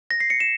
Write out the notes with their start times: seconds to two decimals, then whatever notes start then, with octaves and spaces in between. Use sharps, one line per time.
0.11 A#6
0.20 C7
0.30 C#7
0.40 E7